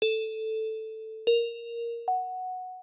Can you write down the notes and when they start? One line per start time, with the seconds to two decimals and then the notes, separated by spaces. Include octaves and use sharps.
0.02 A4
1.27 A#4
2.08 F#5